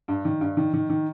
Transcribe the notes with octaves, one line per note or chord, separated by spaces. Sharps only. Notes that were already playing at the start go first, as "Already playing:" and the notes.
G2
D#3
G2
D#3
D#3
D#3